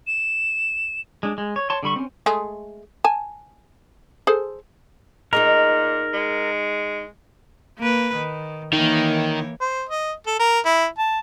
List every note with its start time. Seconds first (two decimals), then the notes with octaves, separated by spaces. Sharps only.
0.07 E7
1.23 G#3 D4
1.38 G#3
1.56 C#5
1.70 C#5 A5 C6
1.83 D3 G3 B5 C#6
1.96 C4 C#4
2.26 G#3 A3 G#4
3.04 G#5 A5
4.27 G#4 A4 C5
5.33 A#2 D#4 G#4 A#4 D#5
6.13 G#3
7.79 A#3 B4
8.15 D#3
8.73 D#3 E3 A#3 C#5
9.61 C5
9.89 D#5
10.27 A4
10.39 A#4
10.66 E4
10.98 A5